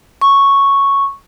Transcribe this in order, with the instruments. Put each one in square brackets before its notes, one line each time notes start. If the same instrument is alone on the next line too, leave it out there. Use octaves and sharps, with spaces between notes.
[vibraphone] C#6